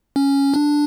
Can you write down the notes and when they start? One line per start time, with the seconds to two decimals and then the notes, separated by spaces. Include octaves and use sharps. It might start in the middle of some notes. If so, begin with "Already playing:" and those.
0.16 C#4
0.54 D4